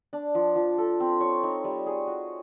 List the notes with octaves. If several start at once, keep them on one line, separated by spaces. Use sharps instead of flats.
D4
F3
F3
A4
C4
C#5
D#4
G3
G#4
F#4